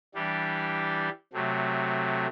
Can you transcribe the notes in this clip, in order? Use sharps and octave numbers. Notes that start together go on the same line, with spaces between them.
E3 G3 D4 G4
C3 F#3 A3